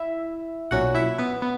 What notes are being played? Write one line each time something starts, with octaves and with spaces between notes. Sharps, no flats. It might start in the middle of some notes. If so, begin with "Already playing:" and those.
Already playing: E4 E5
B1 A#2 F#3 C#4 F#4 F#5
E4 E5
B3 B4
B3